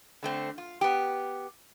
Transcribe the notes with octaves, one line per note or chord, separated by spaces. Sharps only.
D3 A3 C4
F4
B3 G4